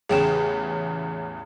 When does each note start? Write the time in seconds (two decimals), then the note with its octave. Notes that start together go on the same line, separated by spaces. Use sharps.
0.09 A1 E2 C#3 G#4 G5 E7